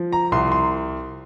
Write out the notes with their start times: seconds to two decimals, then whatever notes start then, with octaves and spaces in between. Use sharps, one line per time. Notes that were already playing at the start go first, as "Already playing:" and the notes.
Already playing: F3
0.13 A#5
0.32 C2 C6
0.52 C6